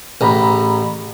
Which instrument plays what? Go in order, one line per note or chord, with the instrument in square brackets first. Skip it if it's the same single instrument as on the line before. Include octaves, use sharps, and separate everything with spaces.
[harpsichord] A1 [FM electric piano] G#4 A#5 B5